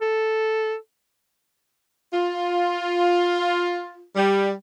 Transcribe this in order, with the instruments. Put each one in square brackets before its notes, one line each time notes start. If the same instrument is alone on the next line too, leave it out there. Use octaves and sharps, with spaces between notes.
[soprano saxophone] A4
[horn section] F4
G3